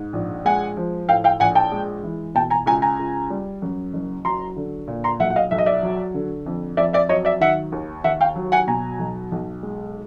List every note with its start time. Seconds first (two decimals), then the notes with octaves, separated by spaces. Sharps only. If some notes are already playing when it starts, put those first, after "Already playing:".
Already playing: G#2
0.13 A#1
0.45 G#3 F#5 G#5
0.77 F3
1.09 A2 F5 G5
1.24 F5 G5
1.40 A#1 F#5 G#5
1.55 G5 A5
1.72 G#3
2.03 E3
2.35 B2 G5 A5
2.50 G#5 A#5
2.66 C#2 G#5 A#5
2.82 G#5 A#5
2.99 C#2
3.30 G3
3.62 F#2
3.93 F#1
4.25 F#3 A#5 C6
4.56 D3
4.87 A#2
5.04 A#5 C6
5.20 B1 E5 F#5
5.30 F#5
5.36 D#5 F5
5.51 B1 E5
5.58 D#5
5.66 D5 E5
5.83 F#3
6.14 D3
6.46 F2
6.77 F2 D5 E5
6.93 D5 E5
7.09 F#3 C#5 D#5
7.25 D5 E5
7.41 D#3 E5 F#5
7.72 D#2
8.04 D#2 E5 F#5
8.21 F5 G5
8.35 F#3
8.52 F#5 G#5
8.67 B2 G#5 A#5
8.99 B1
9.32 B1
9.63 G#3